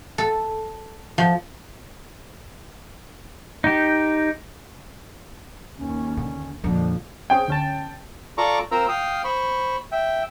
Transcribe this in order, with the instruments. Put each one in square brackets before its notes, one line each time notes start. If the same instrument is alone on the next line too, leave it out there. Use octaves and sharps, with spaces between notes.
[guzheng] A4
F3
[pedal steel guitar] D#4 G4
[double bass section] D#2 [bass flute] C#4
[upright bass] D3 [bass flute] C#4
[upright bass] F2 [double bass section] A#2 D3 F3 [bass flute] D4
[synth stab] C4 C#4 G#4 [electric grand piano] G5
[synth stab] D2 C#4 A5
[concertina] F4 A4 D5 A#5 C#6 D6
C4 F4 A#4 C5 A#5 E6
F5 G5 D#6 F6
C5 B5 C#6
E5 G5